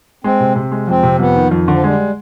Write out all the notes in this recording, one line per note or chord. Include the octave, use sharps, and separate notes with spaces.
G#3 C4
C3
C3
G#3
F2 C4
C3
F2 B3
D#3
F2
D3 F3
G3 G#3